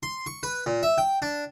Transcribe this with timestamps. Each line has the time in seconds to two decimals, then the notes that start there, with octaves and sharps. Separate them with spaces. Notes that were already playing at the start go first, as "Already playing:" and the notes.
0.03 C6
0.26 C#6
0.43 B4
0.66 A#2
0.83 E5
0.98 G5
1.22 D4